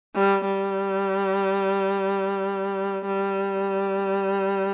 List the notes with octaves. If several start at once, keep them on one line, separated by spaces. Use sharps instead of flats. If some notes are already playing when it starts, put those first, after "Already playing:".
G3
G3
G3